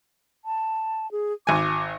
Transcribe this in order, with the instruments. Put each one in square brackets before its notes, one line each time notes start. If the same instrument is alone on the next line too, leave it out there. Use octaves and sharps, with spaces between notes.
[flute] A5
G#4
[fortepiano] G#1 G#5 [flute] D6